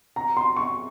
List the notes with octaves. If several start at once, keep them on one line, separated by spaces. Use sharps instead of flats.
A#5
C6
C#6